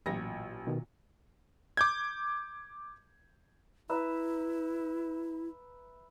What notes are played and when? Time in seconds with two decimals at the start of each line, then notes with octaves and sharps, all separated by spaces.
0.06 A1 A#2 F#3 A#6
0.67 B2 D#3
1.77 D6 G6 G#6
3.89 E4 B4 E5 A#5